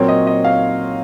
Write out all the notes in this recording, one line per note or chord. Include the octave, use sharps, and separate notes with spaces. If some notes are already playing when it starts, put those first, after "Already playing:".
Already playing: A#2 F#3 C4 C#5
D#5
D#5
F5